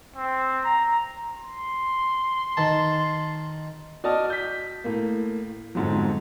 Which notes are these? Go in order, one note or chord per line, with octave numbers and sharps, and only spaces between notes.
C4
A#5
C6
D#3 A5
F#4 D5 D#5 A5 D#6 F6
G6 B6
A2 A#3
G1 F2 G#2 F3 F#3